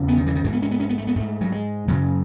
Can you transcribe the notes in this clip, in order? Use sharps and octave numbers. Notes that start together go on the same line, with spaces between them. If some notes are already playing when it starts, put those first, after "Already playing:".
Already playing: E2 C#3
B3
D#3
E3
D#3
G#2 E3
B3
C#4
B3
C#4
B3
A3
B3
G#2 A3
F#3
G#3
F#2 C#3 F#3